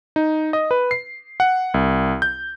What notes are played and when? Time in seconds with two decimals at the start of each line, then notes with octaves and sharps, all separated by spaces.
0.16 D#4
0.53 D#5
0.71 B4
0.91 C7
1.40 F#5
1.74 C2
2.22 G6